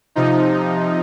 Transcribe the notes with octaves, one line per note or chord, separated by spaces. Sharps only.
C3 F3 D#4